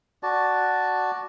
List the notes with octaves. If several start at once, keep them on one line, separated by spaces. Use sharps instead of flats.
F#4 D5 A5